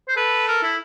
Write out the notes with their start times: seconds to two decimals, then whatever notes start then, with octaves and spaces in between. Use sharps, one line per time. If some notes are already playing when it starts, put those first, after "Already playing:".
0.08 C5
0.17 A4 B4
0.48 A#4
0.63 E4